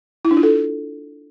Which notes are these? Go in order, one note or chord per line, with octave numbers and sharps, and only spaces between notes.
E4
D4
F4
A4